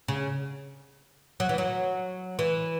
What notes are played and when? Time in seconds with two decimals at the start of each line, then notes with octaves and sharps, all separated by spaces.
0.08 C#3
1.40 F#3
1.49 E3
1.58 F#3
2.39 E3